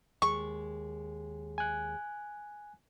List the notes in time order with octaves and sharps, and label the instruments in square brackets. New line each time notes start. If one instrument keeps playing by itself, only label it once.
[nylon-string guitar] D#2 G#3 [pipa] C#6
[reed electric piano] G#5 F#6